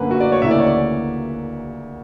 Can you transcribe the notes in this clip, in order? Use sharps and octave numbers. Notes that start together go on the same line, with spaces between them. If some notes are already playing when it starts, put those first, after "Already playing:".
Already playing: F#2 D3 A#3 B4
F#4
D5
C#5
D2 C#3 E3 A#3 E5
D5
C#5
D5